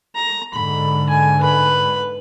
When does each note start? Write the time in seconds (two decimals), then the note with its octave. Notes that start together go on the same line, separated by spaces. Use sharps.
0.15 A#5
0.54 G#2 D3 B5
1.10 G#5
1.40 B4 B5